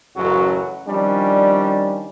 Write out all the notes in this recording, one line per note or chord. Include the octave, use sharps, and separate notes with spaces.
A1 F#2 C#3 F#3 C#4 F#4
D#3 F3 G3 C#4 D4